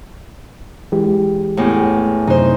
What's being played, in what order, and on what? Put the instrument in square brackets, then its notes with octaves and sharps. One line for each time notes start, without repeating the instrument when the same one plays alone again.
[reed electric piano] E3 G#3 G4
[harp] E2 A2
[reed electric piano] F#2 C3 [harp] D#4 C5